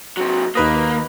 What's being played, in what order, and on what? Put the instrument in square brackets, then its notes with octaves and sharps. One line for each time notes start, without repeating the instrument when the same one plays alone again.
[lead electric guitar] C3 F#3
[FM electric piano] D#2 B4 D#5 [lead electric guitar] A#3